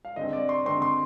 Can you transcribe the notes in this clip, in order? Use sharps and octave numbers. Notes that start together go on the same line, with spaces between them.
F5
D3 G#3 C4 D#5
D5
C6
D3 G#3 C4 C6
C6